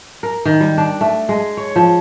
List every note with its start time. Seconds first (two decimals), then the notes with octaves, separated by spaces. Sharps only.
0.23 A#4
0.45 D#3
0.60 G3
0.78 D4
1.01 A3
1.29 G#3
1.57 C#5
1.76 F3